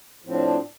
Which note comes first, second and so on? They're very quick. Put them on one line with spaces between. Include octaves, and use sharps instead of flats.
A2 F3 C4 D4